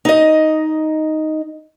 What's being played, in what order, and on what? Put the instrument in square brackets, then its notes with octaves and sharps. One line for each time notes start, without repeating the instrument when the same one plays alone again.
[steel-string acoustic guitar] D#4 D#5